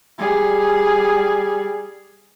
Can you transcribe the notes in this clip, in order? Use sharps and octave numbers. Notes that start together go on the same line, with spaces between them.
G3 G#4